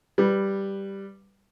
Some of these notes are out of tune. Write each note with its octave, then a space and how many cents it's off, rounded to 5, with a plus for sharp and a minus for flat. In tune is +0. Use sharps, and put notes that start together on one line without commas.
G3 +0 B4 +0